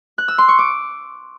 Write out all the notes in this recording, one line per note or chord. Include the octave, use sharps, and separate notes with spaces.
F#6
E6
C6
C#6
D6